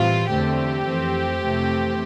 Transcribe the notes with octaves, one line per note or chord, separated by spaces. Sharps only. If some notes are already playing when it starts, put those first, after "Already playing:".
Already playing: A2 E3 G3 C4 F4
E2 D3 A3 C4 G4
F2 E3 A3 C4
F2 C3 E3 A3 C4